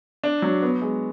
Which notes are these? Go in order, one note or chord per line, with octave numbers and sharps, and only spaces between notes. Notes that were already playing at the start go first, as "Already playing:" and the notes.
D4
F#3
B3
G#3